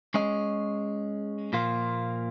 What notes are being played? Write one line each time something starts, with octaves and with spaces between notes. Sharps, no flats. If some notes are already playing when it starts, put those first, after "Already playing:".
G#3 C#4 G#4 D#5
A#2 F3 A#3 F4